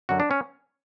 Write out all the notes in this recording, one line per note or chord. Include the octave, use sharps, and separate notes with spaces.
F#2 D3 F#3 F#4
D4
C#4